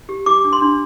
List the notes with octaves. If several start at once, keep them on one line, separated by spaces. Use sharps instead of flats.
G4
G4 D6
D4
C6
D4